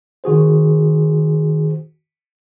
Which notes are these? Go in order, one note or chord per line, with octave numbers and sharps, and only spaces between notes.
D#3 F#4 G#4 C5